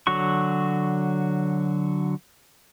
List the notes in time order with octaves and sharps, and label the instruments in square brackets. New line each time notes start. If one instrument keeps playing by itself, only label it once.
[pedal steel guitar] D3 F#3 F#4 C#6